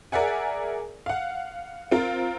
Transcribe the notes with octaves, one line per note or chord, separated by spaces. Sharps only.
G#4 A#4 D5 E5 F#5 G#5
F5 F#5
C4 F4 A#4